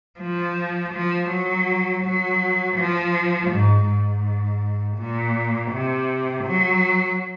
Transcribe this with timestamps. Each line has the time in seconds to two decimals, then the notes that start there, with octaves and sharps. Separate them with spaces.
0.20 F3
0.93 F3
1.30 F#3
2.03 F#3
2.77 F3
3.50 G#2
3.87 G#2
4.98 A#2
5.71 C3
6.44 F#3